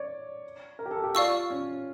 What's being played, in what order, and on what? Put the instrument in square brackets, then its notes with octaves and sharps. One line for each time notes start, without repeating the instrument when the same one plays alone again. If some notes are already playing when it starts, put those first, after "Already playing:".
Already playing: [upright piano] C#5 D5
A#4
G4
A4
G4
[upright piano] F4 [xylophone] D5 F5 C#6 E6
[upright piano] C#4